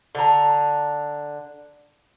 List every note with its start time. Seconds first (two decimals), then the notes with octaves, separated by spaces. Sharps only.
0.15 D3 A#5